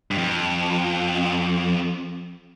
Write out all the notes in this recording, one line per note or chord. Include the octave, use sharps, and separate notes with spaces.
G2
F2